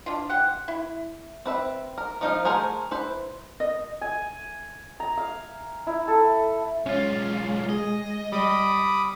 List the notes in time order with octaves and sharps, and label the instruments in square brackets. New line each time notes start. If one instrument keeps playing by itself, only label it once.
[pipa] D4 F4
G4 F#5
E4
[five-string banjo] C4 B4 E5
A#4
F3 D#4 C5 F5
A3 G#4 A#4 C5 G#5
E4 B4 C5
[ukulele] D#5
[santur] G#5
A#5
F5
E4
A4
[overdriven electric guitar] B1 F4 [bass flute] G#3 [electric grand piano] C#4
[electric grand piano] G#4 [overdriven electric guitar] D#5
[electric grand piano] G3 [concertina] B5 D6 D#6